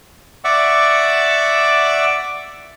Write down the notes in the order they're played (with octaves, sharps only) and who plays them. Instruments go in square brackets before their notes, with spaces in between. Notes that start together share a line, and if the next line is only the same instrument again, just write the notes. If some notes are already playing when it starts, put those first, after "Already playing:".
[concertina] D5 E5 F#5 C#6 D6 E6